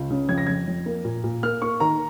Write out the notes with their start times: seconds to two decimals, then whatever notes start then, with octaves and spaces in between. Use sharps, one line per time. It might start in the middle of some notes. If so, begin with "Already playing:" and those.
Already playing: C#2
0.10 C#3
0.29 F2 G#6
0.38 A#6
0.47 F2 G#6
0.68 F2
0.86 A#3
1.05 A#2
1.24 A#2
1.43 A#3 F6
1.62 A#3 C#6
1.80 D#3 A#5